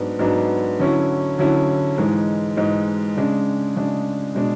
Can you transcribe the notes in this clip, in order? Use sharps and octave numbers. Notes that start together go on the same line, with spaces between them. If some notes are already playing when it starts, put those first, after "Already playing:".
Already playing: G#2 F#3 B3 D4
G#2 F#3 B3 D4
D3 F#3 C#4 E4
D3 F#3 C#4 E4
G#2 E3 G#3
G#2 E3 G#3
C#3 G#3 D4
C#3 G#3 D4
B2 G#3 D4